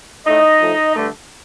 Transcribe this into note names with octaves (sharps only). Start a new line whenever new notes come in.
A2 A3 D#4 D#5
A2 F3 A3
G2 D3 A3